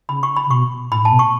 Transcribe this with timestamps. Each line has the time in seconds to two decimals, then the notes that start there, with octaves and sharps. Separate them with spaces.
0.09 C#3 B5
0.23 C#6
0.37 B5
0.46 C#3
0.51 B2 C#6
0.91 A2 B5
1.03 A2 A5
1.12 B2
1.19 C#6